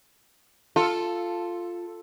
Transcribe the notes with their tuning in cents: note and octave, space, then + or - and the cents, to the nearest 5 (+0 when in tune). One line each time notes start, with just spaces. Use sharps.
F4 +0 A4 +0